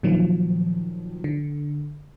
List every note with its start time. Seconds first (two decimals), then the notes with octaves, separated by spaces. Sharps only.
0.03 A#2 D#3 F3 F#3
1.24 D3